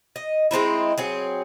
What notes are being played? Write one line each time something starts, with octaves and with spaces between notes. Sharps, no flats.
D#5
G#3 C4 D#4 E4
F#3 C4 G#4